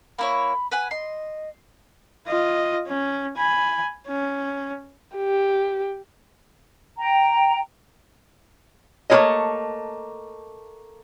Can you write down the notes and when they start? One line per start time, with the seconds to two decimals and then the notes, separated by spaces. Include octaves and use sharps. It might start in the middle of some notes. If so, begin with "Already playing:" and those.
0.19 A#3 E4 C#5 B5
0.71 B4 F#5 G#5
0.91 D#5 C6
2.27 F4 D#5
2.88 C#4
3.37 G#5 B5
4.07 C#4
5.16 G4
6.98 G5 A#5
9.10 A3 A#3 E4 F4 C#5 D#5